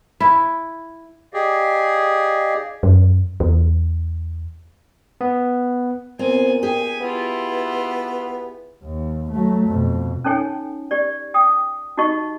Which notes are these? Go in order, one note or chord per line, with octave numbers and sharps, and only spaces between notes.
E4
G4 G#4 D5 D#5 F5
F#2
E2
B3
A#2 B3 C4 G#5
G4 G#4 G#5
B3 E4 F4
D#2
F#3 A3
F2 B2
C#4 D#4 A4 C#5 G5 G#5
G4 D5
G5 D#6
D#4 F#4 G4 D#5 C#6